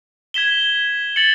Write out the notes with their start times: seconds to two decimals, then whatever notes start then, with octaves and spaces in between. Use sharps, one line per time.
0.34 G#6 B6 E7 G7
1.16 A6 C#7 F#7